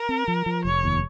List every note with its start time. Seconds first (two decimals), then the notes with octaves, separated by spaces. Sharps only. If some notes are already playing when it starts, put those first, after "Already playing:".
Already playing: A#4
0.09 C4
0.28 F3
0.46 F3
0.65 F1 C#5
0.84 D#2